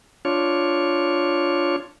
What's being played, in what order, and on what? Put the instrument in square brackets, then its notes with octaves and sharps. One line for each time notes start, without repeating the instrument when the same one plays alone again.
[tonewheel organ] D4 F4 C#5